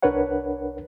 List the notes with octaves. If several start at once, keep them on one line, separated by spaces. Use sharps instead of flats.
C2 D4 A#4 B4 C#5 F#5